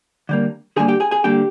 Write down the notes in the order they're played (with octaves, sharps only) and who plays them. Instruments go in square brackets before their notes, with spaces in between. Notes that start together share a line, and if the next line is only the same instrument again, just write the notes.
[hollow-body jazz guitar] D3 G3 A#3
D3 G3 A#3 G#4 G#5
G4 G5
G#4 G#5
G#4 G#5
D3 G3 A#3 G4 G5